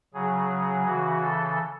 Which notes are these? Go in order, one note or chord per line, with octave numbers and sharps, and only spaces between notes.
C#3 F#3 G#4
C#3 E3 F#4
A4